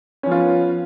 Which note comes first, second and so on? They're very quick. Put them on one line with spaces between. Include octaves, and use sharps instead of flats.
C#4 F3 B3 F4